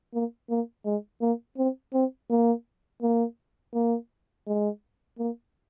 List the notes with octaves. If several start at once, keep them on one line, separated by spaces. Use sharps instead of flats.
A#3
A#3
G#3
A#3
C4
C4
A#3
A#3
A#3
G#3
A#3